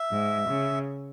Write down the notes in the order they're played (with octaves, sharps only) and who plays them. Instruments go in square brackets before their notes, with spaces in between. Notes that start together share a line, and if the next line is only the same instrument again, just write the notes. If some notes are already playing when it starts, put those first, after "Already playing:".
Already playing: [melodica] E5
[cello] G#2
C#3